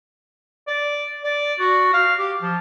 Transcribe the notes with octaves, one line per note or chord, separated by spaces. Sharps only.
D5
D5
F#4
F5
G4
F3